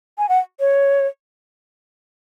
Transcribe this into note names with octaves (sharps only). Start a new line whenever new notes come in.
G#5
F#5
C#5